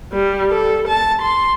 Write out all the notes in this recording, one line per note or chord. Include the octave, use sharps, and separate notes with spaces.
G3
A4
A5
C6